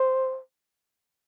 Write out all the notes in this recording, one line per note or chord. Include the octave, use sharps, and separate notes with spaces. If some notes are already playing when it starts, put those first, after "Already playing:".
Already playing: C5